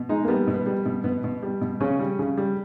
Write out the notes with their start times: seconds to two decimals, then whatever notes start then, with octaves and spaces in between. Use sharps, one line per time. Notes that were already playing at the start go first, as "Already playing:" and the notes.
Already playing: B2
0.09 G#3 D#4
0.25 A#3
0.28 G3 B3
0.47 B2
0.54 B3
0.66 G3
0.86 B2
1.04 B2 B3
1.24 B2
1.43 G3
1.61 B2
1.81 C#3 C#4
1.99 G3
2.19 C#3
2.38 G3